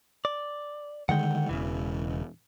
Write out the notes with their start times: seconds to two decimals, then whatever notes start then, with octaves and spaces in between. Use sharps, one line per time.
0.25 D5
1.09 D3 D#3 G#3 F#5 G5
1.49 E1 C#3 E3